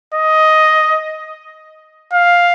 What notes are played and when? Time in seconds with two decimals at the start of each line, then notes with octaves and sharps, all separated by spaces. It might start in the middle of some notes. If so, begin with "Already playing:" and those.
0.14 D#5
2.13 F5